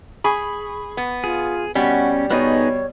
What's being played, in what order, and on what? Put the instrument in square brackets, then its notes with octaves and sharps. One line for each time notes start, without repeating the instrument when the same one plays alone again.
[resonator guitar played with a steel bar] G#4 [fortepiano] B5 C#6
[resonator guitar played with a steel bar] B3
[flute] F4 [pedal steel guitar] G#4
[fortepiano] B2 [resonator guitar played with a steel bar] G3 [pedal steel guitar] C#4 [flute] F#5
[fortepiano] B2 [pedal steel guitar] B3 D#4 G#4 [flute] C#5